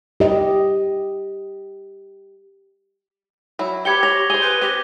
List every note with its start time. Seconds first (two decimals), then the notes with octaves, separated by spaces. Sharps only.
0.20 G4 D#5
3.59 F#3 E4
3.85 G4 B4 C5 G5 G#6 C#7 G7
4.03 C#5 A#6 F7
4.30 G#4 C5 A#6 D#7 G7
4.42 B4 G6
4.61 C4 G4